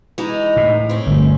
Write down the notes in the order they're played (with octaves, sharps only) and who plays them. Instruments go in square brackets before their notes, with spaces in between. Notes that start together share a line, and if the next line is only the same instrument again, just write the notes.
[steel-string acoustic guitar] E3 G#3 D#4
[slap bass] A2
[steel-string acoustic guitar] C4 C#4
[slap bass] G1 A3